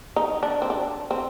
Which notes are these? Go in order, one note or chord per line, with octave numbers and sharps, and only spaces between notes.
D#4
D4
C4
D4
C4